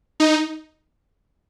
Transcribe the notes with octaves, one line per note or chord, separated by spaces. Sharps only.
D#4